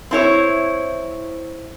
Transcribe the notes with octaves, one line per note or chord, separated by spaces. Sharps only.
C4 E4 C#5